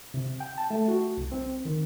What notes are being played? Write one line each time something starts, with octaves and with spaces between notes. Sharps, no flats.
C3
G5
A5
A3
F#4
C2
C4
D#3